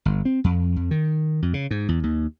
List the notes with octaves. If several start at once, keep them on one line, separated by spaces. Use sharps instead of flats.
G1
C4
F2
F2
D#3
F2
C#3
G#2
E2
D#2